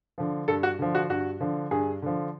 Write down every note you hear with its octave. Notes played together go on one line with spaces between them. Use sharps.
D3 F3
G2 A4
F#4
D3 F3
F#4
G2 F#4
D3 F3
G2 G#4
D3 F3